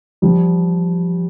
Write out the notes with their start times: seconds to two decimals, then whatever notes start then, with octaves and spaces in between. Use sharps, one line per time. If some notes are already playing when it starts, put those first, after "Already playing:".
0.22 F3 G3